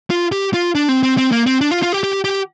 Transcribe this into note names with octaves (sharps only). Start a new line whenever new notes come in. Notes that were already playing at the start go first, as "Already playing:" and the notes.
F4
G4
F4
D4
C4
C4
C4
A#3
C4
D4
F4
F4
G4
G4
G4